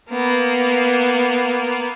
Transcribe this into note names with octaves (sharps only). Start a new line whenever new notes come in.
A#3 B3